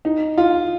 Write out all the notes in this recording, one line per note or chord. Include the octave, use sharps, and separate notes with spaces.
D#4
F4